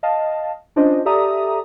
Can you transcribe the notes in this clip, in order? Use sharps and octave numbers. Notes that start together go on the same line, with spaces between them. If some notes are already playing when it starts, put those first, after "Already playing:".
D#5 F5 A5
C#4 D4 F4 C5 D#5
G4 A4 D5 E5 A#5 D#6